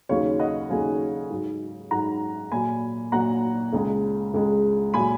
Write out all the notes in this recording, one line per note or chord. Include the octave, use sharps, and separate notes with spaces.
D#2 C#3 F#3 C#5 F5
D#5 F#5
D#2 C#3 F#3 F5 G#5
G#2 F#3
G#2 F#3 F#5 A#5
A#2 F#3 G#5 B5
A#2 F#3 F#5 A#5
C#2 C#3 G#3
C#2 C#3 G#3
A#2 F#3 G#5 B5